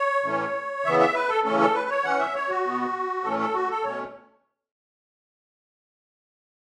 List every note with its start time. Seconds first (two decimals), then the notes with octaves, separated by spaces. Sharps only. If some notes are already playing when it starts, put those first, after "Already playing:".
Already playing: C#5
0.24 A2 E3 A3 C#4
0.85 C#3 E3 B3 E5
0.99 E5
1.14 B4
1.29 A4
1.44 C#3 E3 A3 C#4 A4
1.60 A4
1.74 B4
1.90 C#5
2.04 E3 C#4 F#5
2.19 E5
2.35 C#5
2.49 F#4
2.64 B2 B3
3.24 A2 E3 A3 C#4 A4
3.39 A4
3.54 F#4
3.69 A4
3.84 B2 A3 C#4 C#5